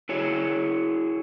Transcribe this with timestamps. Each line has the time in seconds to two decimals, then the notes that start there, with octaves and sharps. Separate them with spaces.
0.09 E4 F#4 G#4 C#5